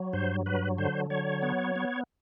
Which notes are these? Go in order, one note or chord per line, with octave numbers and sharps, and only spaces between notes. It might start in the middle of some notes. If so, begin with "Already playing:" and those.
Already playing: F#3
G2 C5
F#3 B4
D3 C5
F#3 C#5
B3
B3